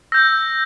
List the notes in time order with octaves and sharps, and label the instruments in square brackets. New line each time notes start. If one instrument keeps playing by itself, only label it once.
[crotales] E6 G6 A#6